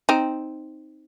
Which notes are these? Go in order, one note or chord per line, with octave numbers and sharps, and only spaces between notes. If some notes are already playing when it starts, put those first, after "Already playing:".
C4 D#4